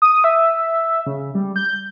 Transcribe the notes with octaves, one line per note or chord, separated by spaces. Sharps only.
D#6
E5
C#3
G3
G6